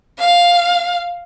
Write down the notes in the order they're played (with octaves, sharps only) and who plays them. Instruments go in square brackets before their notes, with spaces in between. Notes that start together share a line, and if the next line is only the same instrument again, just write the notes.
[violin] F5